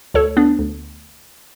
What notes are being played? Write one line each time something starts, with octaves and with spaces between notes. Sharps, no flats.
D2 A4 C#5
B3 D4
D2